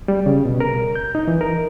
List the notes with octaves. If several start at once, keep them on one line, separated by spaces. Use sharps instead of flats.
G3
C#3
B2
A#4
G6
D#4
E3
A#4